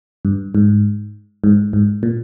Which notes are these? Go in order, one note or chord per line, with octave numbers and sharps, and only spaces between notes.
G2
G#2
G#2
G#2
A#2